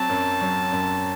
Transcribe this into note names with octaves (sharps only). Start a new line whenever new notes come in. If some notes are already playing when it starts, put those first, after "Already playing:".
Already playing: F#3 C4 A5
F#2
F#3
F#2